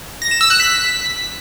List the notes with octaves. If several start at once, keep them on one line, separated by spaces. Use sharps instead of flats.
A#6
E7
E6
F#6
B6